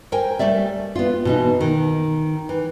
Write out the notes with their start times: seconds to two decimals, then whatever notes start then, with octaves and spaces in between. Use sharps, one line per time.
0.12 A#4 C5 G5 G#5
0.39 G3 A3 D5 E5
0.95 B3 F4
1.25 B2 E3 D#4
1.60 D#3
2.49 E3